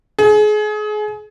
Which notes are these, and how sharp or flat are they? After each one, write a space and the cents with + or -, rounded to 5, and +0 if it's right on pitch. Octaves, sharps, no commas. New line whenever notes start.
G#4 +30